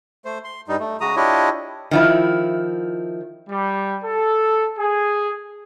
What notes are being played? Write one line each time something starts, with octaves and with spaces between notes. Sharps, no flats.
A3 C5
C6
G2 G3 D#4
A3
C#3 G#3 F#4 A#5 D#6
D4 E4 F4 G4 C#5 D#5
D#3 F3 E4
G3
A4
G#4